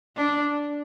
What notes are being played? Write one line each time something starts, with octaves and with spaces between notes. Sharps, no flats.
D4